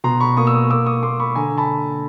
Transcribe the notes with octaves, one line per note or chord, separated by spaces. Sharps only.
B2 A#5 C6
B5 C#6
A#3 C#6 D#6
E6
C#6 D#6
A#3 D6 E6
C#6 D#6
A#3 C6 D6
B5 C#6
D3 G#5 A#5
A5 B5